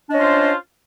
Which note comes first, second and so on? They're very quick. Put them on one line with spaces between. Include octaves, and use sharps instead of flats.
D4 D#5 C#4 F4 C5